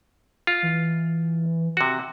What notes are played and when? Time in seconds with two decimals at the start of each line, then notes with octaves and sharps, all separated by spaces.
0.47 F4
0.63 E3
1.77 C3 F#4